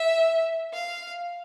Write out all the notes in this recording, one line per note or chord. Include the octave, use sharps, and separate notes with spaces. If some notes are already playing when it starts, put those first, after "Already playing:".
Already playing: E5
F5